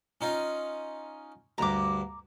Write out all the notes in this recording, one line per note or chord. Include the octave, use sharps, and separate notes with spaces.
C#4 D#4 F4
D2 G2 A#5 D6